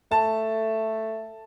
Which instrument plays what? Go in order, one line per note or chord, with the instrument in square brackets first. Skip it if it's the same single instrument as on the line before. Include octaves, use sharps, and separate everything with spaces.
[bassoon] A3 [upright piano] A5